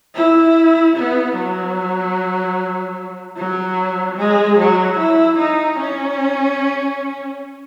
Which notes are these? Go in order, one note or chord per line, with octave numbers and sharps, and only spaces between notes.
E4
B3
F#3
F#3
G#3
F#3
E4
D#4
C#4